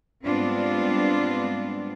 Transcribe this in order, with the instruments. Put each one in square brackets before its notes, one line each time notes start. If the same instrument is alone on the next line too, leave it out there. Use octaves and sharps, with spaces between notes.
[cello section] G#2 G3 B3 C4 D4 F4